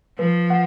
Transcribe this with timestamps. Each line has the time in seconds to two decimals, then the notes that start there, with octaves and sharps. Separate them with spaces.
0.19 F3 B4
0.50 F#5